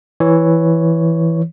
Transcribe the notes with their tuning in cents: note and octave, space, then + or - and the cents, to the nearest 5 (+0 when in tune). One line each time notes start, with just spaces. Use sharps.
E3 +0 C#5 +0